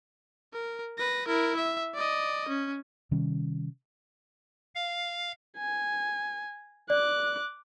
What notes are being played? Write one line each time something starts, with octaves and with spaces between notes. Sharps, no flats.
A#4
B4 A#6
E4 A#4
E5
D5 D#5
C#4
C3 D#3 G3 C#4
F5
G#5
D5 D6 F#6